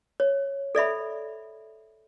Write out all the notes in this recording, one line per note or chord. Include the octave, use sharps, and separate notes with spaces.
C#5
A4 D5 E5 B5